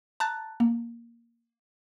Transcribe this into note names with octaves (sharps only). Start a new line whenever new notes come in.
A5 A#5 F#6 A6
A#3